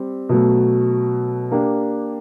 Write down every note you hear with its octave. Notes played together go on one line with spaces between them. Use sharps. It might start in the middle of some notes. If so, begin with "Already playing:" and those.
Already playing: G3 C4
B2 F#3 A3
A#3 D4 G4